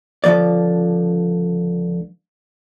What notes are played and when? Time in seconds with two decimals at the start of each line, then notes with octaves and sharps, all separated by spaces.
0.24 C#2 D3 F3 A#3 D5